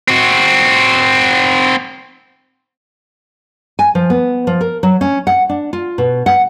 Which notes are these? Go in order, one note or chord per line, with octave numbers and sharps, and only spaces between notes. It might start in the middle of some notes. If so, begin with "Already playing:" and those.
C4 F#4
G#5
F3
B3
F3
A#4
F#3
C#4
F#5
D4
F4
B2
F#5